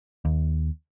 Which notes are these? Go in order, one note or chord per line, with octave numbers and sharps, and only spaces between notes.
D#2